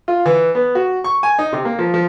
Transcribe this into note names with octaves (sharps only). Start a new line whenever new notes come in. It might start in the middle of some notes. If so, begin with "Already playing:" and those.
F4
E3
B3
F#4
C#6
G#5
D#4
C3
A#3
F3
F3